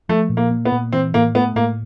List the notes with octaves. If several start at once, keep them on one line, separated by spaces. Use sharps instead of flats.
F3 A3
A#2
A#3
A#3
B3
A#2
E3 C4
A2 A#3
A3 B3
A2 A#3